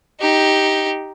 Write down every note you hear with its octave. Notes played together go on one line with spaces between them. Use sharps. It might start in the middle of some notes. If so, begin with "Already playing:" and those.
D#4 G4